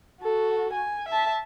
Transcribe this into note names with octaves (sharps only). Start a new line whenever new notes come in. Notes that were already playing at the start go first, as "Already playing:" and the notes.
F#4 A4
G#5
E5 A5